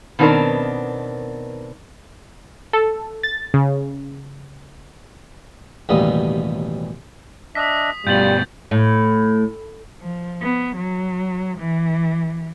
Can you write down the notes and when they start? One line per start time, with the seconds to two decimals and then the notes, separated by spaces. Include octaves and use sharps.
0.19 B2 D#3 B3 C4 D4 A#4
2.73 A4
3.23 A6
3.54 C#3
5.89 A1 D#2 B2 G3 A#3 D#6
7.55 D4 D#5 E5 D#6 B6
8.07 G2 B2 G3 F4 G6 A6 F#7
8.71 A2
10.01 F3
10.42 B3
10.76 F#3
11.57 E3